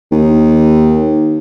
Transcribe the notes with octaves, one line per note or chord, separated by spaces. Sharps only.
D#2